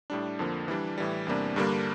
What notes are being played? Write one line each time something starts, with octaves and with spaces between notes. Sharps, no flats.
A2 G3 D4
F2 D3 F3 A#3
E3 G3 D4
A2 E3 G3
E2 C3 G3 A#3 D4
G2 D3 G3 A#3 D4